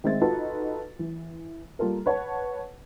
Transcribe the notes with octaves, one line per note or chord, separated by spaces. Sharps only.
D#3 G#3 C4 E5 A6
D#4 F4 F#4 A4 B4
E3
G3 A#3 F4 A4 A#4
B4 C#5 F#5 A5